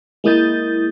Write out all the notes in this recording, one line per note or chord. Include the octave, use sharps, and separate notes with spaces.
G#3 A#3 E4 D#6 G6 A6